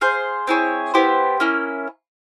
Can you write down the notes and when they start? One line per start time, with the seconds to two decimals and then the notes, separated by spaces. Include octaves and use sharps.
0.01 G#4 C5 F5
0.47 C4 E4 G#4 C#5
0.94 B3 E4 G4 C5
1.40 A#3 C#4 E4